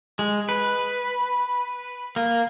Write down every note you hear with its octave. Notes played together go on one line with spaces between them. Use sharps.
G#3
B4
A#3